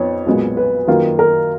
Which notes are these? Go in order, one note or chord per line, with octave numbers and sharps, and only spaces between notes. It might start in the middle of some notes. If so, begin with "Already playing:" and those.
Already playing: F2 F3 B3 D#4 C#5
B1 A#2 G#3 B3
B4
F#2 D#3 A#3 F4
A#4